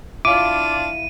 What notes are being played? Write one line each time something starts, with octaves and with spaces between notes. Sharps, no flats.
D4 E4 F4 F5 D6 D#7